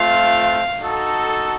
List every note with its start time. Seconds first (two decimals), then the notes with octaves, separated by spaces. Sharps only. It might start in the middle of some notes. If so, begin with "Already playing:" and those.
Already playing: A3 C4 F4 F5
0.80 D#4 F#4 A4